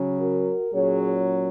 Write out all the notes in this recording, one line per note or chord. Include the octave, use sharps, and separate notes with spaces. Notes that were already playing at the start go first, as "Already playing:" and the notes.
Already playing: C#3 F#3 C#4
F#4 A#4
A#2 F#3 C#4 G#4 C#5